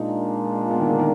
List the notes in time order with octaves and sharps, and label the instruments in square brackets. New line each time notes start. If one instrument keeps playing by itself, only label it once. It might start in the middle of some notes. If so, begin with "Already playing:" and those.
Already playing: [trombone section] A#2 G#3 D4 F4 A#4 [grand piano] D#4
[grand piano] B3
D#3
D3
D#3